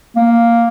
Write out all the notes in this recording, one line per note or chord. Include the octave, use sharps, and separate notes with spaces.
A#3